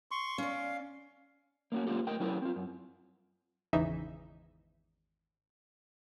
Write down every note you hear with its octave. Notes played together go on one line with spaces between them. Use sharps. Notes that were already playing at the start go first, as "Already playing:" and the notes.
C6 C#6
C#4 D5 F5
A#3 C#4 E4 F#4
G#3 A#3 F4 G4 A4
A3 A#4 D#5 G5
F#3 C#4 E4 G4 A4 A#4
C4 F4
F#2
G#1 E2 C#3 E3 D#4 E5